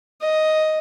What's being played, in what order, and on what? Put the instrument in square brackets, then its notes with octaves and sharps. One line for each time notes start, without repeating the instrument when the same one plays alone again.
[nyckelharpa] D#5